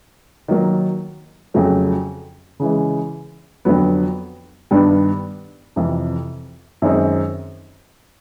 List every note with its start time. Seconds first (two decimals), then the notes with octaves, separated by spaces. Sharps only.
0.48 D#3 F#3 A#3
1.54 F2 C#3 F#3 A3
2.60 C#3 E3 G#3
3.65 F2 D3 F#3 B3
4.71 G2 D#3 G3 B3 D4
5.76 F2 C3 E3
6.82 F#2 D#3 G#3 C4 D#4